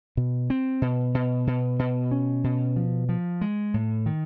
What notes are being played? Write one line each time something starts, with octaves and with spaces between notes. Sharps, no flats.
B2
C4
B2
B2
B2
B2
C#4
B2
F3
F3
G#3
A2
D#3